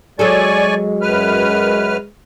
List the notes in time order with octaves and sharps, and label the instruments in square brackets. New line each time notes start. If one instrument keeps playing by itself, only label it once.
[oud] F#3 G#4 A4 [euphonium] G#3 [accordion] D5 G#5 C#6
[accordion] F#2 B4 F6